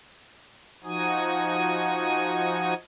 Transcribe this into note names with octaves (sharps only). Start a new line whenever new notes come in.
F3 D#4 F#4 G#5 D#6